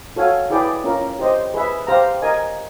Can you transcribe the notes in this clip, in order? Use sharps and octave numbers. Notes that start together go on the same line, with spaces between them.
F#4 A4 C#5 F5 G#5
E4 G#4 B4 D5 G5
C#4 F4 A#4
G4 C5 D#5
G#4 B4 E5
G4 C5 F5 A#5
A#4 D#5 G#5